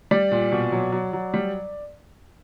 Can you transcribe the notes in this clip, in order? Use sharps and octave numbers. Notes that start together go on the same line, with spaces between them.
G3 D5
A#2
B2
F#3
F#3
F#3
G3